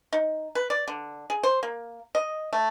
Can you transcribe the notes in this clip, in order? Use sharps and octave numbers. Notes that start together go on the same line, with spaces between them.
D#4
B4
D5
D3
G#4
C5
A#3
D#5
A3